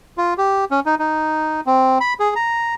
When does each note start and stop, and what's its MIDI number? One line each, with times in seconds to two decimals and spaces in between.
0.18 0.34 65
0.38 0.65 67
0.71 0.80 61
0.86 0.95 63
0.99 1.61 63
1.66 1.98 60
2.01 2.14 83
2.20 2.34 68
2.36 2.74 82